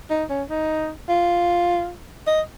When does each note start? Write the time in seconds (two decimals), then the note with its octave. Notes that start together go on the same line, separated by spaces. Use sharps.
0.10 D#4
0.30 C#4
0.50 D#4
1.09 F4
2.27 D#5